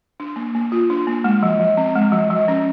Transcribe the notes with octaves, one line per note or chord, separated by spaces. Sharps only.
D4
A#3
A#3
F4
D4
A#3
G#3
F3
F3
C4
G#3
F3
F3
C#4